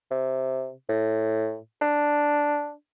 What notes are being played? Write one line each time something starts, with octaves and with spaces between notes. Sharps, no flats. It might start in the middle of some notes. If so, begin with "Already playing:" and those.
C3
A2
D4